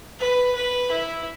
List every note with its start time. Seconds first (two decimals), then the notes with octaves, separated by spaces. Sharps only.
0.20 B4
0.55 B4
0.91 E4